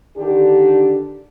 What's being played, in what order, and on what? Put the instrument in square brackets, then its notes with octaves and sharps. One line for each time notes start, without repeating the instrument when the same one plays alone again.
[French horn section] D3 D#3 D4 G4